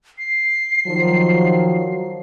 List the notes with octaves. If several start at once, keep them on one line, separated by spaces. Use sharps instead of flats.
C7
D#3 F3 F#3